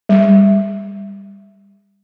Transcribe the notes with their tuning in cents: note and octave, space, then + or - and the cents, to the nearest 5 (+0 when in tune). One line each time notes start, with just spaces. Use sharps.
G3 +25